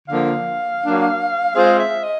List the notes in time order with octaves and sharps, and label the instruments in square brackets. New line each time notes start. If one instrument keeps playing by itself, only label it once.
[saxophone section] D3 F3 A#3 [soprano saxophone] F5
[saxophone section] F#3 A#3 D4
[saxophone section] G#3 C4 F4 G#4 C5 [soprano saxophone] F5
[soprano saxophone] E5
D#5